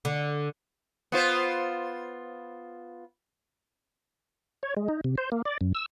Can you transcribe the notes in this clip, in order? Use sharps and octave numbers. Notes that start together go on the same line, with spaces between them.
D3
B3 F4 C5
C#5
G#3
D#4
C3
C5
A#3
D5
F#2
E6